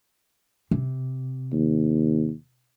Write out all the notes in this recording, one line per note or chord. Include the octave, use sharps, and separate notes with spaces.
C3
D#2